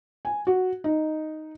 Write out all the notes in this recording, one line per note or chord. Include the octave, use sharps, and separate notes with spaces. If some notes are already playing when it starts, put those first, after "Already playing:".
G#5
F#4
D#4